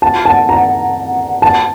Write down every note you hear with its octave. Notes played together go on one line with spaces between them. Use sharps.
A5
A5
A#5
A5